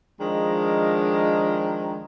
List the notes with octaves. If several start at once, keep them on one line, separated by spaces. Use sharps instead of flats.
D#3 F3 G#3 D4 A#4